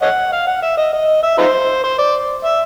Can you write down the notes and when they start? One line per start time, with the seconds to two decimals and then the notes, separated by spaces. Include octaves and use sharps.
0.02 C#5 D#5 F#5
0.32 F5
0.47 F#5
0.62 E5
0.77 D#5
0.93 D#5
1.23 E5
1.38 D#4 F4 C5
1.84 C5
1.98 D5
2.44 E5